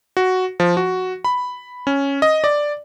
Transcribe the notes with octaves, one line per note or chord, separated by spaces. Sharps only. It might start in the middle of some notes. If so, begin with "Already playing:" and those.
F#4
F3
F#4
B5
C#4
D#5
D5